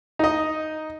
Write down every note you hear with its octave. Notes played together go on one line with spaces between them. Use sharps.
D#4 D#5